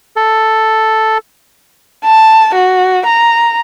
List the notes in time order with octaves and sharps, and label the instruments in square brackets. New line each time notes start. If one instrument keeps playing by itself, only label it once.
[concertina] A4
[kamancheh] A5
F#4
A#5